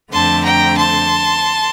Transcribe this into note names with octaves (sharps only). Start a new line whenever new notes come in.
F2 D3 A3 C4 A5 C6
G5 A#5
A5 C6